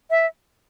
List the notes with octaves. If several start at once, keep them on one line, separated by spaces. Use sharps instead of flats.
E5